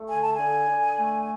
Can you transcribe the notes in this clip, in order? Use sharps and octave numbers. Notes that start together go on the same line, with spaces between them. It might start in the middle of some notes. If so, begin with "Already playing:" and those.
Already playing: A3
D3 G#5
A5
D3 G#5
D3
A3